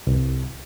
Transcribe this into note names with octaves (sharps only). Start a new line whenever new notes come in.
C2